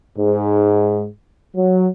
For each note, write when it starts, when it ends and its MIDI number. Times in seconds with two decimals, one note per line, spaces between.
0.18 1.05 44
1.55 1.87 54